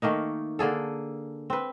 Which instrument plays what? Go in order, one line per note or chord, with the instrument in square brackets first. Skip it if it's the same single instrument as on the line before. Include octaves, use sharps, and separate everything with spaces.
[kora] D#3 A3 A#3 D#4
D3 A#3 G#4 A4
C4 B4